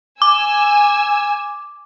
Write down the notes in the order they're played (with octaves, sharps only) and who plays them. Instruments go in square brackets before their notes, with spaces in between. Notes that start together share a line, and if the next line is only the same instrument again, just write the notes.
[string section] G#5 E6 [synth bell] D6